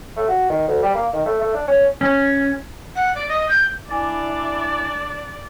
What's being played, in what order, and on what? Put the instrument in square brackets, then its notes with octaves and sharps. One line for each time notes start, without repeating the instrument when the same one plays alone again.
[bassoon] A3
F#4
D#3
D2
G3
A#3
D#3
A3
A3
D4
C#4
[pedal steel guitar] C#4
[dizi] F#5
D5
D#5
G6
[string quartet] D4 [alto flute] E4 [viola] D5 [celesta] G#5 D6 A6